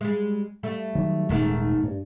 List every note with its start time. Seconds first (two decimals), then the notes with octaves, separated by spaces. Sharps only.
0.01 G3 G#3
0.63 G3 A3
0.95 D#3 F#3
1.29 D#1 G#2 D#3 G#3 A3
1.83 G2